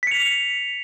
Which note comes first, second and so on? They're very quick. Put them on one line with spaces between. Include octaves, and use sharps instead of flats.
B6 C#7 F7